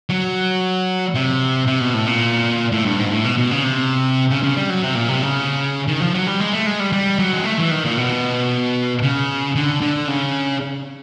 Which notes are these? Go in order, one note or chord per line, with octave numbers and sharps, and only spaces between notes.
F#3
C3
C3
B2
A2
A#2
A2
G2
G#2
A2
B2
B2
C#3
C3
C#3
C#3
G3
F#3
C3
A#2
C3
C#3
D#3
F3
F#3
G3
G#3
A3
G#3
G3
G3
F#3
G#3
A3
E3
D#3
A#2
B2
C#3
D3
D3
C#3